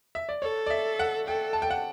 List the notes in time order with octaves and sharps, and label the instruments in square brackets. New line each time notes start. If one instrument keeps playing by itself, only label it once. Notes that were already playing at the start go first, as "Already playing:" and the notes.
[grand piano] E5
D5
[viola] A4 [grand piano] C#5
[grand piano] D5
E5
F#5
[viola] A4 [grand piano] G5
[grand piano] A5
G5
F#5